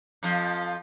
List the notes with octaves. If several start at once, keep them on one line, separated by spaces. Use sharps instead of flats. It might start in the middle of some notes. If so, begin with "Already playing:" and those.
F2 F3